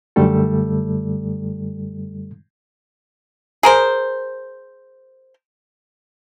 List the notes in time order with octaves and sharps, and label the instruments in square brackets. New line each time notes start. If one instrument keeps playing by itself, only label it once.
[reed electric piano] F#2 D3 G3 A3 A4
[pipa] G#4 A#4 C5